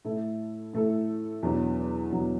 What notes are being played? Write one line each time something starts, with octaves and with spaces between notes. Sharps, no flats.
A2 A3 E4 A4
A2 A3 E4 A4
E2 B2 F#3 D4
E2 B2 F#3 D4